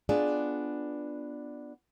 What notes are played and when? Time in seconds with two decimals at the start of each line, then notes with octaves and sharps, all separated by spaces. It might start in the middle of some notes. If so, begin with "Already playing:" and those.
0.09 B3 D4 F4 G#4 D5